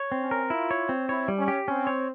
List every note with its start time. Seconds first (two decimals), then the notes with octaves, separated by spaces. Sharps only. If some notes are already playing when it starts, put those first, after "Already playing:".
Already playing: C#5
0.12 C4
0.21 C#4
0.31 A#4
0.50 E4 F4
0.71 C#5
0.89 C4
1.09 E4 C#5
1.28 G3
1.38 C#4
1.48 G4
1.68 C4 C#4
1.87 C#5